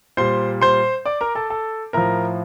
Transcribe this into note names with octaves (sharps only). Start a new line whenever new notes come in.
A#2 G3 C5 C6
C5 C6
D5 D6
A#4 A#5
A4 A5
A4 A5
A2 F3 A#4 A#5